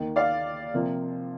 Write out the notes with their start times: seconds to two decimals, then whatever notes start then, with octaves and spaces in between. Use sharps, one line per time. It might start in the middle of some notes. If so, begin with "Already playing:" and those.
Already playing: D#2 D#3 A#3
0.16 D5 F5
0.74 C3 F3 A#3